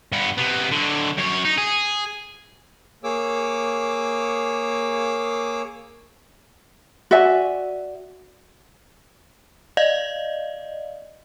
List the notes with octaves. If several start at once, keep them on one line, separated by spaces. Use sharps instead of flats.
G2 B3
C3 B3
D3 F#3
F#2 C#5
D#4
G#4
A#3 G#4 C#5 D6 E6
F#4 D5 E5 G#5
D5 D#5 F5